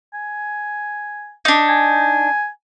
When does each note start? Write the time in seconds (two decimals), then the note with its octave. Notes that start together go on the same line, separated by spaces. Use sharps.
0.14 G#5
1.45 D4 D#4
1.69 G#5